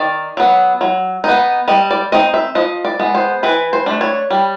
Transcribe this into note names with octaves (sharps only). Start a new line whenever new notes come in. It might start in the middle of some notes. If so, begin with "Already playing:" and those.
Already playing: D#3 D5
F#3 B3
F#3
B3 D#4
G3 D#5
D5
C4 D#4 D#5
E5
F3 D#5
D5
G#3 B3
C5
E3 B4
C5
A3 D4
C#5
G3